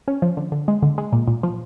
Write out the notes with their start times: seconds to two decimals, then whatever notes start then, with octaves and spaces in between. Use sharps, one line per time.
0.08 C#4
0.22 F3
0.37 D3
0.52 D3
0.68 G#3
0.83 D3
0.98 G#3
1.12 A#2
1.27 A#2
1.43 F3